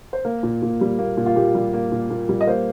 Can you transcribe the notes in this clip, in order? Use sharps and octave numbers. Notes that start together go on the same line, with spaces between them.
C5
A#3 A#4
A#2
A#2
G3
A#3
A#2
F4
A#2 G4
G3
A#3
A#2
A#2
G3
D#5
A#3 C5